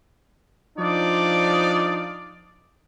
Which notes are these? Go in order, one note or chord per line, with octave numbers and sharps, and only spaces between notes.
F3 D4 D#4 F4 D5